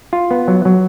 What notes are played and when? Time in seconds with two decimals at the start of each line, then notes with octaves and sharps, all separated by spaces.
0.13 F4
0.31 B3
0.48 F#3
0.65 F#3